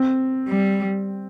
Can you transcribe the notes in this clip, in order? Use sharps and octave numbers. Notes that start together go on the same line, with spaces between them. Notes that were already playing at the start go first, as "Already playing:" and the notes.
Already playing: C4
G3